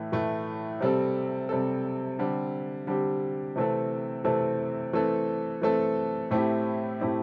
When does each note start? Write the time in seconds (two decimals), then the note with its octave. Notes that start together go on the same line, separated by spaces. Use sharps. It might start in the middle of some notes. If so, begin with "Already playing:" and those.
Already playing: A2 E3 A3
0.12 A2 E3 A3
0.81 C3 G3 C4 A4
1.49 C3 G3 C4 A4
2.19 D3 G3 C4 G4
2.87 D3 G3 C4 G4
3.56 C3 E3 A3 C4 A4
4.24 C3 E3 A3 C4 A4
4.93 E3 A3 C4 A4
5.61 E3 A3 C4 A4
6.31 A2 A3 C4 E4 G4
7.00 A2 A3 C4 E4 G4